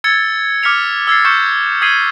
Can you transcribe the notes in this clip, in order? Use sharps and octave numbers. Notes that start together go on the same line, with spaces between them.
E6 G#6 A6 C#7 G7
D6 F6 B6 C#7 F7
E6 G#6 A6 C7
C#6 F6 G6 C#7 E7
D#6 G#6 B6 C7 D#7 G7